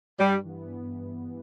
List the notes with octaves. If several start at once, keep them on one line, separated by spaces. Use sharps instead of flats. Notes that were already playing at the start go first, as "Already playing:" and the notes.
G2 G3
E3 B3